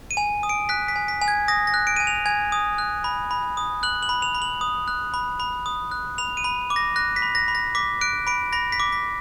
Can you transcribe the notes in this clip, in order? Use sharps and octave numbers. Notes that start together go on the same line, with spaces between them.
D#7
G#5
D#6
D7
F#6 B6
B6
G#5
B6
G#5
G#6
D#6 A#6
A#6
F#6
D7
G#5 D#7
F7
G#5 G#6
D#6
F#6
B5
B5
D#6
F#6 F#7
F#7
B5
F7
B5
F#7
D#6
F#6
B5
B5
D#6
F#6
B5 F7
D#7
B5
D6
A#6
F#6 A#6
B6
B5
A#6
B5
A#6
D6 B6
F#6 D7
B5 D7
B5 A#6
B6
D6
B6